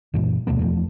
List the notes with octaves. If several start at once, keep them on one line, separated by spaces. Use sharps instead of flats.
F#2 A#2 E3 G#3
D#2 B2 A3 B3
E2 F3 A3